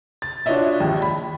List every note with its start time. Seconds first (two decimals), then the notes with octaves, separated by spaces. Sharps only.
0.22 A6
0.46 D4 F4 F#4 C#5 D#5 E5
0.80 A#1 D#2
1.02 B5